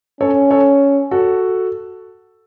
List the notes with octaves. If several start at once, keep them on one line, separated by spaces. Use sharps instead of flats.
C#4 A4 C#5
A4 C#5
F#4 A4